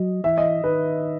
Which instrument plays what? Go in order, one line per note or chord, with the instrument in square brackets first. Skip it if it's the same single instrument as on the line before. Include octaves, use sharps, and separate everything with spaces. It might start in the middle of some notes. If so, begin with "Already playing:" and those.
Already playing: [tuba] F#3 [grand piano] D#5
[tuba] E3 [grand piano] E5
[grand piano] D#5
[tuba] D#3 [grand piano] B4